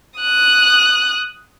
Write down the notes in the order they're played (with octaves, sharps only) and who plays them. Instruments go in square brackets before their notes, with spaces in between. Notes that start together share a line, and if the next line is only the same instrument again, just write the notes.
[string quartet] D#6 F#6